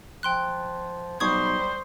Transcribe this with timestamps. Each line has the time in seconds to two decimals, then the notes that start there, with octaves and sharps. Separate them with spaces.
0.23 F3 G5 C6 F#6
1.20 B1 G3 C5 C#6 D#6 G#6